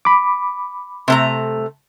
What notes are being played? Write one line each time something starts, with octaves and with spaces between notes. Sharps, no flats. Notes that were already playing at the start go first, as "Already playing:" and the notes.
B5 D6
C3 A3 A#5